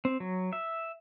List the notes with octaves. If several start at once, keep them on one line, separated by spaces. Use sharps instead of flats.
C4
F#3
E5